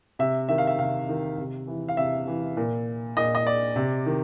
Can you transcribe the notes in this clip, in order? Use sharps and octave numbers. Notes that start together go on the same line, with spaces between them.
C3 E5
D#3 E5
F5
E5
C3 F5
D#3
C3
E3
F5
C3 E5
E3
A#2
A#2 D#5
D#5
D5
C3
D#3